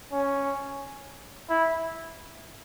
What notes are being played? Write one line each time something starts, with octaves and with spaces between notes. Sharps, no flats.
C#4
E4